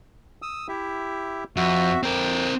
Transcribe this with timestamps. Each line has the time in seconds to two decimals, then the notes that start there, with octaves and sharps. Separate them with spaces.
0.42 D#6 E6
0.68 E4 G4 E5
1.56 F2 F#4 E5
2.03 F2 C4 A#4 G5